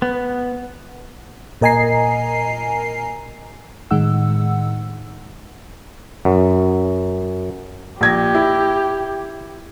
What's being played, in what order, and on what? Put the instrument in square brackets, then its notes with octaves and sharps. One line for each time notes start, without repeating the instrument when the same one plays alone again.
[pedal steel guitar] B3
[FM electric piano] A#2 A#4 D#5 G#5 A#5 C7
A2 D#3 G#3 D#4 F#5 E6
[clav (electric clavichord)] F#2
[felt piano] A#1 G#6 A#6 [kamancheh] G4
[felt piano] E4